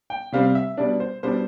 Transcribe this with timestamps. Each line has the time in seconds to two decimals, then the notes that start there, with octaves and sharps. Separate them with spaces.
0.10 G5
0.32 C3 G3 C4 F5
0.55 E5
0.77 B2 G3 D4 D5
1.00 C5
1.23 B2 G3 D4 C5